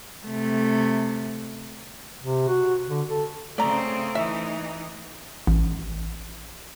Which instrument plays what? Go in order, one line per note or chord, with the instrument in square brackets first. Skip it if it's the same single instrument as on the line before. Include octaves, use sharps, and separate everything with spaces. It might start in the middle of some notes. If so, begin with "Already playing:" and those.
[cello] C3 A3
[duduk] C3
F#4
D3
A4
[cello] C#3 C4 [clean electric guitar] A3 [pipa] D5 A#5
[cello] E3 D#4 [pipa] E5
[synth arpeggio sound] A1